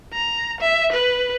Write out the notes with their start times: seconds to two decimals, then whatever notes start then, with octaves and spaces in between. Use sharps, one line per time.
0.14 A#5
0.61 E5
0.92 B4